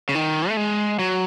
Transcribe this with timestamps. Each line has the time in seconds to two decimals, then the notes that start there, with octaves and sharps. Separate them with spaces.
0.09 C#3
0.15 D#3
0.49 A3
0.57 G#3
0.99 F#3